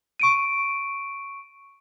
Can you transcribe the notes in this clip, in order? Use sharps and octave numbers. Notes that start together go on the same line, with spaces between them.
C#6 D7 D#7